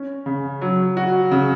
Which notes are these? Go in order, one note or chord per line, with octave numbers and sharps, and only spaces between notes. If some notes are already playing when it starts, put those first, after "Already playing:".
Already playing: C#4
C#3
F#3
F#4
C#3